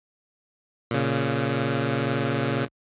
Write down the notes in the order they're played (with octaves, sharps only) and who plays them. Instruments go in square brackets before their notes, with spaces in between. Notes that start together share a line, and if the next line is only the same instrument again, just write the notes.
[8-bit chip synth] A#2 C#3